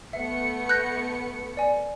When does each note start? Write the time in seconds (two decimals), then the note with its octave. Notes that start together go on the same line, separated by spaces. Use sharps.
0.13 A3 B3 E5 C#7
0.69 F#6 G6 A#6
1.57 D5 G#5